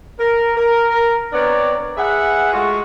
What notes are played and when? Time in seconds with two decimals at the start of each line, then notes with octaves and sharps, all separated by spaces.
0.19 A#4
0.56 A#4
1.32 B3 C4 D4 C#5 D5 A#5
1.97 G#4 B4 E5 F#5
2.52 G#3 A3 F4 F#4